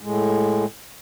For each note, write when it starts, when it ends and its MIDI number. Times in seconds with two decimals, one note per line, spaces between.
0.01 0.65 45
0.01 0.65 56